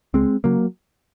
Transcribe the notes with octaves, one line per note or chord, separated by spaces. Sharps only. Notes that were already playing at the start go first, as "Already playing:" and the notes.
C#2 G#3 C4
C#3 F#3 A#3